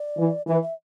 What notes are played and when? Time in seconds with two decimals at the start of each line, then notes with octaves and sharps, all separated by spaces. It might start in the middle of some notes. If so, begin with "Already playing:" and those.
Already playing: D5
0.18 E3
0.47 E3 B4
0.62 E5